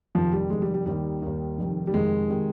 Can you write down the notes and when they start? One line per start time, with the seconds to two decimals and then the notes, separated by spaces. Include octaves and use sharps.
0.15 F1 F2 D#3 F3
0.33 G3
0.50 F1 F2 D#3 G#3
0.62 G3
0.74 G3
0.86 D#2 D#3 G3
1.22 D#2 D#3
1.58 F1 F2 D#3
1.87 G3
1.93 F1 F2 D#3 G#3
2.30 C3 D#3